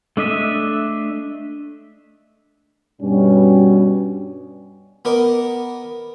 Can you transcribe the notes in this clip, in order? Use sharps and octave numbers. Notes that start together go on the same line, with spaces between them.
A3 D4 D#5 E5
G2 B2 G3 C#4
B3 A#4 D#5 D6